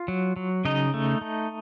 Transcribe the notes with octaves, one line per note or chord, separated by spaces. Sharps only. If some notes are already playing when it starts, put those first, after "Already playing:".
Already playing: F4
F#3
F#3
C#3 D#4 D#5
A3
A3